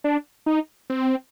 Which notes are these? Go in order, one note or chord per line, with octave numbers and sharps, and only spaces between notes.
D4
D#4
C4